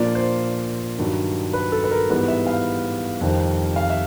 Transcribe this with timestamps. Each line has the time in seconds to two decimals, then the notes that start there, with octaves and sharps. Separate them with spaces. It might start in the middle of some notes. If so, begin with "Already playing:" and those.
Already playing: A#2 F3 A#3 D4 F4 D5
0.15 C5
0.98 G2 D#3 F#3
1.53 B4
1.72 A4
1.84 B4
1.91 A#4
2.10 G#2 E3 G3 B3 E4 B4
2.28 E5
2.47 F5
3.21 F2 C3 D#3 G3
3.76 F5
3.90 E5